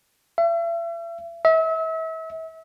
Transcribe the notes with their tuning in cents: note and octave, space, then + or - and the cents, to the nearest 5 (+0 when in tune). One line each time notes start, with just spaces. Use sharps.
E5 +40
E5 -35